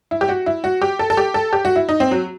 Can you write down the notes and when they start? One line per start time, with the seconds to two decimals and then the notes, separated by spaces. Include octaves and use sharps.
0.11 E4
0.21 G4
0.29 F#4
0.46 E4
0.64 F#4
0.82 G4
0.99 A4
1.10 A4
1.17 G4
1.34 A4
1.53 G4
1.65 F#4
1.76 E4
1.89 D#4
2.00 C4
2.11 F#3